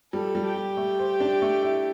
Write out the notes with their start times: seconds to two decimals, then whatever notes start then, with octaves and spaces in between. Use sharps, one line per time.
0.13 G3 A4
0.35 G3
0.45 G4
0.56 G3
0.77 A3
0.99 C5
1.20 D4
1.42 A3
1.63 E4